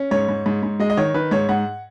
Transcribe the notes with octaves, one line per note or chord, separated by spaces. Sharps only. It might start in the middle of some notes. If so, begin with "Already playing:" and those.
Already playing: C#4
G#2 C#5
G#2
G#2
G#2
G#3 D#5
D#5
D#3 C#5
D#3 B4
G#2 C#5
G#2 F#5